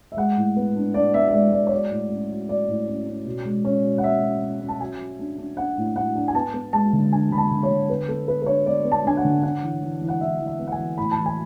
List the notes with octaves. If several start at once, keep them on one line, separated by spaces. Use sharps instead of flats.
E5
G#3 F#5
A2
B3
D4
D4 D5
B3 E5
E5
G#3 D5
G#3 D5
C#5
F#3 D5
A2
C#4
F#3
F#3 D5
A2
C#4
C#4
B2
G#3
C#4
B2
F#5
C#4 E5
C#4
C#4
C#4
A5
F#3 G#5
F#3
D4
D4
D4 F#5
A2
A2 F#5
D4
G#5
B3 A5
B3
G#3 A5
D3
D4 G#5
D3 B5
A5
D3
C#5
D3
B3 B4
B3 A4
B3 B4
B4
D4 C#5
B3 D5
B3
A5
D4 G#5
F#5
D3
D4 F#5
E3
E3
E3
F#5
E3 E5
E3
E5
B3
F#5
G#5
E3
A2 B5
E3 A5
G#5